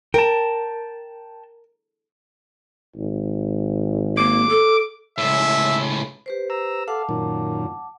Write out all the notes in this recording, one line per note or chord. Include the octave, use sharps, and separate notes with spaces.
A#4 G5 A5
G#1
A#3 D6
A4
C#2 A2 E5
G4 B4 C5
A#5 E6
A4 F5 F#5 A5 D6
F#2 A#2 D#3